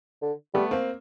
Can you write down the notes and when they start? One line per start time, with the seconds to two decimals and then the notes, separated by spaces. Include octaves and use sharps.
0.22 D3
0.54 G3 A3 B3
0.71 A#3 C4